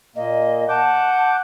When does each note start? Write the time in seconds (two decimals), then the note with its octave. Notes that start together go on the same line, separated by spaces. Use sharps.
0.16 A#2 A#3 D#5
0.69 F#5 A5 D6 G6